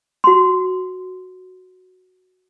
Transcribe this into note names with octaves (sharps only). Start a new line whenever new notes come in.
F#4 C6